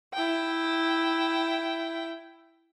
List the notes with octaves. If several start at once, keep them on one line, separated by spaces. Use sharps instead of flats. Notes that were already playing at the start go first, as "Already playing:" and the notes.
E4 G5